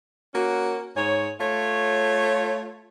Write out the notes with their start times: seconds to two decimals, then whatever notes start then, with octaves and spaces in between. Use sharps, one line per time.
0.34 A#3 C#4 F#4
0.96 G#2 G#4 C#5
1.40 A3 F4 C#5